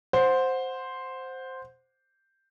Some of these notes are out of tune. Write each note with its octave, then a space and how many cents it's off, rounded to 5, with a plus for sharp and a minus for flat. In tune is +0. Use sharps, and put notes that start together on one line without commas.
C5 +0 F#5 -20